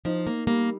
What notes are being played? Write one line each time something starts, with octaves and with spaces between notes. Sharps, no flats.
F3 D#4
A#3
G3 A#3